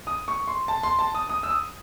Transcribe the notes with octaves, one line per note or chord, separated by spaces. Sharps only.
D#6
C#6
C6
A5
C6
A5
D#6
D#6
E6
D#6